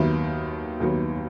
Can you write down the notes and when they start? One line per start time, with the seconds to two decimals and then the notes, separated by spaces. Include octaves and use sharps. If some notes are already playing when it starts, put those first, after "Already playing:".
Already playing: D#2 D#3 F#3 B3 E5
0.80 D#2 D#3 F#3 B3